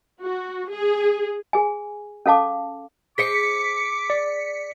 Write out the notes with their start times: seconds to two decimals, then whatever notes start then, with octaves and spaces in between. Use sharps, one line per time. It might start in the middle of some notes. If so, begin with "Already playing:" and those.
0.20 F#4
0.70 G#4
1.53 G#4 G#5
2.26 C#4 A4 F5 A5 D6
3.18 G#4 C5 D#5 D6 B6 C#7
4.10 D5